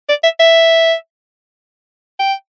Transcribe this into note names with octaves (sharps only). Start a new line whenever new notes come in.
D5
E5
E5
G5